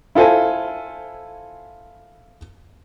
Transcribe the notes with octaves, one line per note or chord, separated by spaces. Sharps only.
E4 F4 A4 C5 G#5